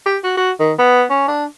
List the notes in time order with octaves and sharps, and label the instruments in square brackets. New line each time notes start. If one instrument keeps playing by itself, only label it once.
[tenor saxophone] G4
F#4
F#4
D#3
B3
C#4
D4